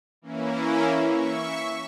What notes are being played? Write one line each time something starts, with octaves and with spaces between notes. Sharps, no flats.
E3 A#3 C#4 E4
E5 C#6